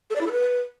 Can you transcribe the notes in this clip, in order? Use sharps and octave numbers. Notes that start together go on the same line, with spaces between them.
A4
D5
E4
A4
B4